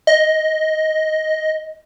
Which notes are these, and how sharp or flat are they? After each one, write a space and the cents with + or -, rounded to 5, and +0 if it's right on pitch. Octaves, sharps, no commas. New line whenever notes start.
D#5 +10